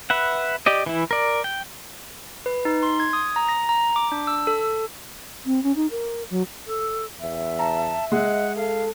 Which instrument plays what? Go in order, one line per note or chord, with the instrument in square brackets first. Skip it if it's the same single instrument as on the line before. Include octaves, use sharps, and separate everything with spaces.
[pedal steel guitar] B4 E5 F#5
G4 D5 D#5
E3 E4
A#4 D5
G5
[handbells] B4
D#4
C6
G#6
D#6
A#5
A#6
A#5
D6
D4
E6
A4
[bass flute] C4
C#4
D#4
A#4
F#3
[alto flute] A4
[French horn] E2 [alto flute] E5
[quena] A5 [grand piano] A#5
[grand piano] G#3 [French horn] D#5 [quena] F#5
[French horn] A4 [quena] F5